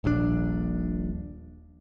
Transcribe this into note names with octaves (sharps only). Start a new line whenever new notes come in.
D#1 A#1 G#2 D4